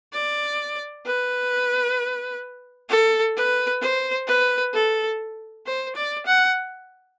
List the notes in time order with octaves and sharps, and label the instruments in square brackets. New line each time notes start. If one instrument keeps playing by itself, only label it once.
[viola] D5
B4
A4
B4
C5
B4
A4
C5
D5
F#5